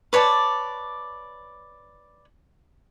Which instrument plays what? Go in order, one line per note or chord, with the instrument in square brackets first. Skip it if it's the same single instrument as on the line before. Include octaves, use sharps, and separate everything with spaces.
[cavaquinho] B4 C#5 D5 A5